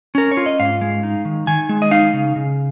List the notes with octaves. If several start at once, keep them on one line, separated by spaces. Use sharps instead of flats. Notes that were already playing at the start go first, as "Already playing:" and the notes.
C#4 A#4
C#5
F4
D#5
G#2 F5
G#3
D#4
D#3
D#3 G#5
G#3
D#5
D#4 F5
C#3
C#3